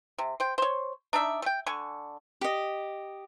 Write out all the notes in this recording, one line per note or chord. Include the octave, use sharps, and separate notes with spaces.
C3
C5 G5
C5 C#5
D4 D#4 D5 E5
A3 G5
D3 G#5 C#6
G4 D#5